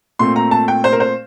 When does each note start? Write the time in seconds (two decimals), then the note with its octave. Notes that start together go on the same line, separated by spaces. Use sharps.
0.19 A#2 A3 C4 C6
0.36 A#5
0.51 A5
0.68 G5
0.84 C5
0.92 A#4
1.00 C5